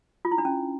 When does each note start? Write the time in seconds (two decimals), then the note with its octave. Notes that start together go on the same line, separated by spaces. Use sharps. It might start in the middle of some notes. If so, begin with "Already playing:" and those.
0.25 F4
0.31 E4
0.38 D4
0.45 C#4